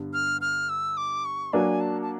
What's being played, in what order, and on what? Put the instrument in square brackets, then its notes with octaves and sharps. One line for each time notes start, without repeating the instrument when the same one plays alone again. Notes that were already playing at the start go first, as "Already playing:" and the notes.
Already playing: [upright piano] G2 D3 G3 B3
[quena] F6
F6
E6
D6
C#6
[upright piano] F#3 A#3 D4 [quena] G#5
[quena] A5
A5